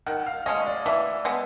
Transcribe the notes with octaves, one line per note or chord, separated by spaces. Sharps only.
D#3 F#5
F5
G#3 C#4 D#5
D5
E3 E5
G#3 B3